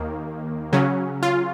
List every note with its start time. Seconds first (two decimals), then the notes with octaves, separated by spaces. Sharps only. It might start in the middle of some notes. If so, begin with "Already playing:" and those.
Already playing: D#2 D#3 A#3
0.73 C#3 F#3 C#4
1.23 F4